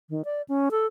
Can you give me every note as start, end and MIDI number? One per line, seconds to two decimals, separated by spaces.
0.10 0.22 51
0.25 0.42 74
0.49 0.69 61
0.71 0.86 69